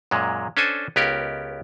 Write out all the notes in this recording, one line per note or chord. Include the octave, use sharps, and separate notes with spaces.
F#2 A#2 G#3
C#4 D4 A4 C5 G#5
C#2 B3 C#4 G4 A#4